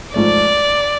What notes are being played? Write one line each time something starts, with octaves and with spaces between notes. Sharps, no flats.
G#2 F3 A3 D5